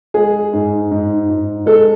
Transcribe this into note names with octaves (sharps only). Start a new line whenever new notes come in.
G#3 G#4
G#2
G#2
G#2
G#3 A4